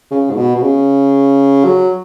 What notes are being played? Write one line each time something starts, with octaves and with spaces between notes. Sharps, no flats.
C#3
G#2
B2
B2
C#3
F#3